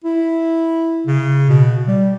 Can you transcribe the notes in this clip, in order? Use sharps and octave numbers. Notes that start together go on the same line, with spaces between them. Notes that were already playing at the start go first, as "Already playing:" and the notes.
E4
C#3
B2
G3